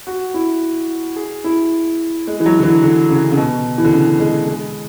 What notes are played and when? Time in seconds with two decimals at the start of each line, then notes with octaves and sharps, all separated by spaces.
0.07 F#4
0.34 E4
1.16 G#4
1.44 E4
2.27 G#3
2.40 E3
2.46 F#3
2.59 D3
2.63 E3
2.83 D3
3.10 C#3
3.31 C#3
3.37 B2
3.78 E3
3.85 D3
3.92 C#3
4.20 G#3
4.48 G#3